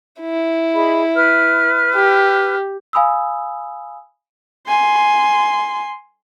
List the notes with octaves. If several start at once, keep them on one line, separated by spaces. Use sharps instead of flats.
E4
G#4 D#5 B5
B4 F6
G4
F5 G#5 B5 D#6 E6
G#5 C6